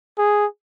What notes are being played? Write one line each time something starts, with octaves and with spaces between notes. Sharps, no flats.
G#4